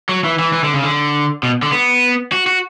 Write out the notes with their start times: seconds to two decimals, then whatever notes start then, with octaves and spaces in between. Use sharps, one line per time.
0.09 F#3
0.24 E3
0.39 E3
0.53 E3
0.64 D3
0.74 C#3
0.84 D3
1.43 B2
1.62 D3
1.72 B3
2.32 F#4
2.47 F#4